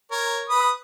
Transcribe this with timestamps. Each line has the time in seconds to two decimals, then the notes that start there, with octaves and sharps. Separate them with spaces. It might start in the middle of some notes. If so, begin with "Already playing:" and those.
0.11 A#4 C#5
0.50 B4 B5 D#6